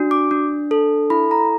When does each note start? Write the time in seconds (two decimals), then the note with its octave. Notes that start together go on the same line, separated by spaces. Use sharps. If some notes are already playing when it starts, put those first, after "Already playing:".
Already playing: D4 F#4
0.11 D6
0.31 D4
0.71 A4
1.10 E4 B5
1.31 A#5